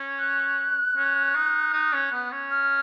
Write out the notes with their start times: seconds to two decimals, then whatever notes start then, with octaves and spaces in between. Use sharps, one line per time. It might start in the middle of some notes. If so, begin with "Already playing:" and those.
Already playing: C#4
0.19 F#6
0.97 C#4
1.35 D#4
1.73 D#4
1.93 C#4
2.12 B3
2.32 C#4
2.51 F6